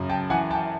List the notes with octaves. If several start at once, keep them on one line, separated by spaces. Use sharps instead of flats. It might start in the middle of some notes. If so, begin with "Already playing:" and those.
Already playing: F#2 C#3
G5 A5
E3 F#5 G#5
G5 A5